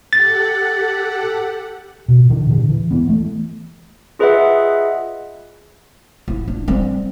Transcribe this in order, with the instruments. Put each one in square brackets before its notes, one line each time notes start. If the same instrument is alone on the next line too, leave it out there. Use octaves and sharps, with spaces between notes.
[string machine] G4 A4 F#5 [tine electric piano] A6
[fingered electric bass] B2
D3 E3 D4
A#2 D3
E3
E3 B3
A3
[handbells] F4 G#4 B4 D#5 E5 F#5
[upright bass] E4
D4
G3 C4